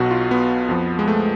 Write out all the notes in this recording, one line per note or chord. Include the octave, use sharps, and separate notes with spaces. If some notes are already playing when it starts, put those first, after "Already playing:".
Already playing: B1 B2 F#4
F4
B3
F2 F3
G#3
A3